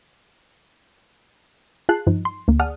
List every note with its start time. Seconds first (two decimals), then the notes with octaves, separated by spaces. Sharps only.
1.89 F4 G#4 A5 F#6 C7
2.07 G2 F3 D#4
2.25 C6
2.48 D2 A#3
2.59 G#4 D5 F#5 A5 D#6 F6